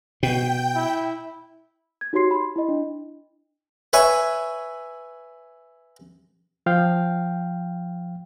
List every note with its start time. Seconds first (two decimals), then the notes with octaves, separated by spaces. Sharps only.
0.23 B2 G5 G6
0.76 E4
2.01 G#6
2.13 D#4 F#4 G4 C#5 C6 C7
2.31 B5 C6
2.56 E4 D#5
2.69 D4
3.93 B4 C#5 E5 G#5
6.66 F3 F5 G5